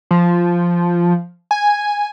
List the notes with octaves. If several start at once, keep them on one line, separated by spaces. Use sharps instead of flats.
F3
G#5